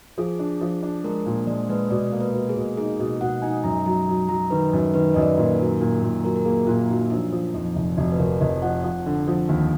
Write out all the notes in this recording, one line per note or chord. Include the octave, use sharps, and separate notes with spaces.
F3 G#4
D4
F3
D4
G#3 A#4
A#2
G#3 D5
G#3 B4
B2 D5
A#3
B4
B2
G#4
B2
D#4 G#4
B2
B2 F#5
D#4 G#5
F#2 A#5
F#3 A#5
F#3
F#3 A#5
D#3 B4
F#2
D#3 B4
F#2 D#5
D5
B4
A#2 A#4
F#3
A#2
A#2
F#3 A#4
A#4
A#3 G#4
A#2 F4
F#3 D#4
F3 D4
F3
F2 D#4
F1
F1 F#4
B4
F1 A#4
F1 D#5
F3 F#5
F3
D3
F3
D#2